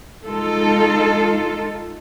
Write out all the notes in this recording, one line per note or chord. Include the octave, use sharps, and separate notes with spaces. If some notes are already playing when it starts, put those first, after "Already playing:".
G#3 D#4 F4 A4